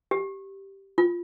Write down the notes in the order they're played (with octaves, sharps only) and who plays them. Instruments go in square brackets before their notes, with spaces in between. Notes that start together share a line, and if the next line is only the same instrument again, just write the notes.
[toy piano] G4
F4